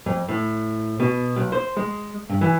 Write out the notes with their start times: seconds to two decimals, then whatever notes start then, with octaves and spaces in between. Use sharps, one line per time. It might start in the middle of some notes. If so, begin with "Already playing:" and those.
0.06 F2
0.29 A2
1.00 B2
1.36 B1
1.52 C5
1.77 G#3
2.29 G2
2.41 E3